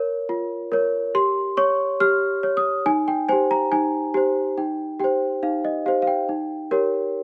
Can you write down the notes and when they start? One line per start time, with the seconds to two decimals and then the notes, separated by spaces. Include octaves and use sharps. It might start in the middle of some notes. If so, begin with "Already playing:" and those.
Already playing: A#4 C#5
0.29 F4
0.72 A#4 C#5
1.15 G4 C6
1.57 C#5 C#6
2.00 G4 F6
2.43 C#5
2.57 D#6
2.86 D#4 G#5
3.08 G5
3.29 G4 C5 G#5
3.51 A#5
3.72 D#4 G#5
4.14 G4 C5
4.58 D#4 G5
5.00 G4 C5 G5
5.43 D#4 F5
5.65 D#5
5.86 G4 C5 F5
6.02 F5
6.07 G5
6.29 D#4
6.71 G4 A#4 C#5